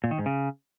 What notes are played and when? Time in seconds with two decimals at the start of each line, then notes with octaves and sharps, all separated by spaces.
0.04 A#2
0.11 D#3
0.19 G#2
0.26 C#3